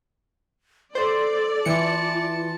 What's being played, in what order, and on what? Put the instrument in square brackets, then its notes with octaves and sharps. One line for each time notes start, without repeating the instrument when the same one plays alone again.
[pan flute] A4 [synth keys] C5 [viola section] D5
[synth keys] E3 C#7 [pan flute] F4 [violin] A5